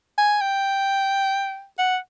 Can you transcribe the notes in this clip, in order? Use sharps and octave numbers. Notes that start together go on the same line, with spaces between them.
G#5
G5
F#5